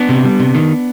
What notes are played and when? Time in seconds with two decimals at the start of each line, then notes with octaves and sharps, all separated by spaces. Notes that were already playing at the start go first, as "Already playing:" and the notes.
Already playing: B3 D4
0.09 C3
0.25 G3
0.40 C3
0.55 D#3